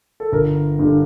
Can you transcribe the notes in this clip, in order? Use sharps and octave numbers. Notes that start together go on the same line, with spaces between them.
A4
G1 A#4
G2 D3